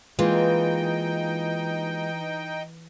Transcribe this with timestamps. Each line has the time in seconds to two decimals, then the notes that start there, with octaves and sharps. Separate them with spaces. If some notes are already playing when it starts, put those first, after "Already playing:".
0.19 E3 G#3 A#3 D#4 F4 G5